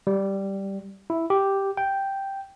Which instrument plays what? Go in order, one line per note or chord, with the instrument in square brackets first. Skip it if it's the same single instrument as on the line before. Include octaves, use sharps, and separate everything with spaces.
[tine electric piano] G3
E4
G4
G5